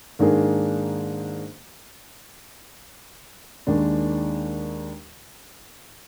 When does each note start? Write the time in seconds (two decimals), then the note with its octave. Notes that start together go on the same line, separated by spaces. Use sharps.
0.19 G#2 D#3 A#3 D4 G#4
3.67 D#2 D#3 G#3 D4